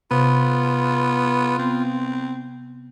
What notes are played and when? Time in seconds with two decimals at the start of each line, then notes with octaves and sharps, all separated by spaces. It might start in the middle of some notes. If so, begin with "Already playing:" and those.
0.11 C3 B3 F4
1.59 B3 C4